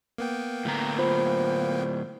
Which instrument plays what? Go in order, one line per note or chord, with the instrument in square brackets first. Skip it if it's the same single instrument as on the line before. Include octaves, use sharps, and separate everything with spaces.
[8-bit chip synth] A#3 B3 G5
[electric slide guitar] A2 D3 A#5
[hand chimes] F4 C5 B5